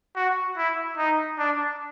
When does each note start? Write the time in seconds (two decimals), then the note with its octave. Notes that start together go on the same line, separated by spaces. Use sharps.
0.16 F#4
0.57 E4
0.98 D#4
1.38 D4